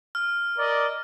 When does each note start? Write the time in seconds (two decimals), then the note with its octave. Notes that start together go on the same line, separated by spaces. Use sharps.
0.15 F6
0.58 A#4 D5 D#5